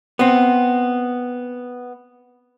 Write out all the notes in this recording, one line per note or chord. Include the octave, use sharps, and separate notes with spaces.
B3 C4